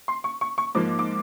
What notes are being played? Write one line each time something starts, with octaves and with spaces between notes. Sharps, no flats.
C6
C#6
C#6
C#6
G#2 F3 A#3 D6
D6